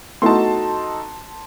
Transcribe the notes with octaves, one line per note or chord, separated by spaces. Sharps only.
A3 B3 D#4 E4 F#4 A4 A5 C6